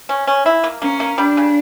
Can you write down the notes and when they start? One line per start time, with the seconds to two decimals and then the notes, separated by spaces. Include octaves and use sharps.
0.09 C#4
0.27 C#4
0.46 E4
0.64 A#3
0.82 A#3 C#4
1.00 A#3
1.18 G3 D4
1.37 C#3